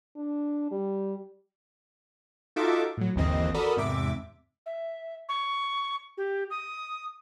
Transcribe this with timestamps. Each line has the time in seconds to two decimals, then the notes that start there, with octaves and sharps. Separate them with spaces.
0.16 D4
0.71 G3
2.56 D#4 F4 F#4 A4 E5 D6
2.97 A2 F#3
3.16 G1 D#2 E3 C4 D#5
3.54 F#4 A4 A#4 D5 B5 D#6
3.76 E2 G#2 C3 E5 D6
4.66 E5
5.29 C#6
6.17 G4
6.50 D#6